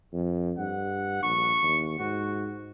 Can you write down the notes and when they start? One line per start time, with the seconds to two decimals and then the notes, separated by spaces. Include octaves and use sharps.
0.13 F2
0.58 G2 F#5
1.23 A#1 C#6
1.62 D#2
1.99 G#2 F#4